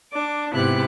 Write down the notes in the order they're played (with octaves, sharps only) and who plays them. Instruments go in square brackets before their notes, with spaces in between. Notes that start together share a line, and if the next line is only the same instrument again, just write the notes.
[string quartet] D4 D6
G#2 C3 B3 E4 G4 F#6